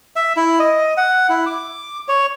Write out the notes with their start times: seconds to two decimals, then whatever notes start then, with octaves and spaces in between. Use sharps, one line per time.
0.16 E5
0.37 E4
0.59 D#5
0.97 F#5
1.29 E4
1.46 D6
2.08 C#5